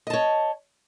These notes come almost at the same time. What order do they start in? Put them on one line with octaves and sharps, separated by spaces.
D#5 A5 C#5